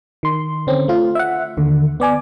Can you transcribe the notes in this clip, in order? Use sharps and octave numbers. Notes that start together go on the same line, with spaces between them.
D#3 C6
D3 C4 C#4
A3 F4
E5 F#5
D#2 D3
B3 D5 G#5 D6